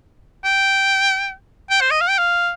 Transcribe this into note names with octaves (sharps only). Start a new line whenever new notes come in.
G5
G5
C5
D#5
F5
G5
F5